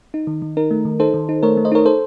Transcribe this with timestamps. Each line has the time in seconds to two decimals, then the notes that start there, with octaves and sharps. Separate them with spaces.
0.14 D#4
0.27 D#3
0.42 D#3
0.57 D#4 A#4
0.71 A3
0.85 D#3
0.99 D#4 A4 C5
1.14 D#3
1.29 D#4
1.43 A3 A#4 C#5
1.57 A3
1.65 C5 D#5
1.72 D#4 A#4 C#5
1.85 A4 C5